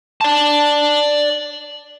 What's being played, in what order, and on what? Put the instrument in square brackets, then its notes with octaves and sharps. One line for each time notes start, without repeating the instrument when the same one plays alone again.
[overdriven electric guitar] D5 A5